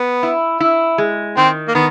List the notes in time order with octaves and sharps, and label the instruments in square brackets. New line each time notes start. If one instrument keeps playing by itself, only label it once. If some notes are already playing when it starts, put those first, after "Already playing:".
Already playing: [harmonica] B3
[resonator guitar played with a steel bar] E4
E4
G#3
[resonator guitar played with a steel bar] D#3 [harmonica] C4
[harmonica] A#3
[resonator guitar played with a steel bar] D#3 [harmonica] B3